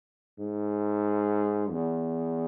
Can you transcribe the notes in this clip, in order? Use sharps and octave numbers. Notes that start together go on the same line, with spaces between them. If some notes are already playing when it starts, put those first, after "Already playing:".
G#2
E2